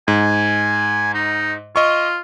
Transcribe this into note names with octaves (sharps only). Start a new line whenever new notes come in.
G#2 G#5
D#4
F4 D#5 C#6